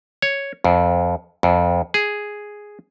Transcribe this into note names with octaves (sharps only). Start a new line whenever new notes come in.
C#5
F2
F2
G#4